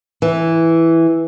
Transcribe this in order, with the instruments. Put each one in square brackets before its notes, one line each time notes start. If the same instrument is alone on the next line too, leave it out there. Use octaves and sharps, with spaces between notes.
[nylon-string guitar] E3